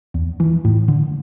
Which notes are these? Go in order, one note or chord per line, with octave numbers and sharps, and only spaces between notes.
E2
E3
A2
D3